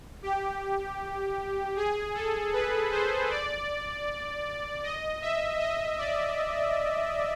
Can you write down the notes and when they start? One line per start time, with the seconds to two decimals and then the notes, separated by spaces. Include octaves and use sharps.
0.23 G4
1.76 G#4
2.15 A4
2.53 B4
2.91 C5
3.30 D5
4.84 D#5
5.22 E5
5.60 D#5
5.98 D5